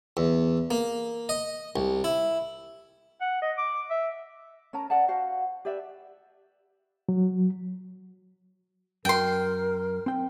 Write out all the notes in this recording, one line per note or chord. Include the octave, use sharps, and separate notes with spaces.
E2
A#3
D#5
C2
E4
F#5
D#5
D6
E5
C#4 A#4 A5 A#5
A#4 D5 F#5 A5
F#4 C5 F5 F#5
G4 B4 D5 E5
F#3
F#2 A#4 G5 C6
C4 G5